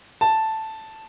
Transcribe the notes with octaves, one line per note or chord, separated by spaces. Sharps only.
A5